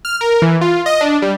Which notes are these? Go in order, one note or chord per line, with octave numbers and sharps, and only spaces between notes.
F6
A#4
E3
F4
D#5
D4
G3